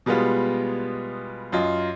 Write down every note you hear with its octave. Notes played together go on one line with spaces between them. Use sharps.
B2 G3 G#3 B3 F4
F#2 F4 D#5